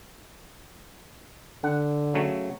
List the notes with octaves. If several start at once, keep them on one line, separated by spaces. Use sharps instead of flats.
D3 F#5
C#3 F#3 A3